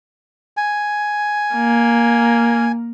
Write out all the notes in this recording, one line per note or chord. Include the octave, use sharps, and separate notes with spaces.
G#5
A#3